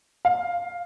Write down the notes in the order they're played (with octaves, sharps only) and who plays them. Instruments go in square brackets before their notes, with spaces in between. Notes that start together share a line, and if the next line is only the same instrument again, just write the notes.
[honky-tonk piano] F5